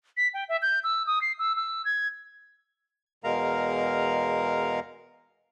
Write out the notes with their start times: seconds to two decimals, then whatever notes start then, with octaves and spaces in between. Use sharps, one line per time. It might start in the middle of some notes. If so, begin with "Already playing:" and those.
0.17 B6
0.34 G5
0.49 E5
0.62 G6
0.84 E6
1.07 D#6
1.22 C7
1.39 E6
1.57 E6
1.85 G#6
3.24 E2 B2 G#3 A#4 F5 A#5